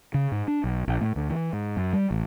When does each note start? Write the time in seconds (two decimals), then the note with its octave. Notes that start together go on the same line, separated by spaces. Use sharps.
0.14 C#3
0.32 G#2
0.48 D4
0.64 B1
0.88 A#1
1.01 A2
1.16 D2
1.30 E3
1.53 G#2
1.77 F#2
1.93 G3
2.11 A1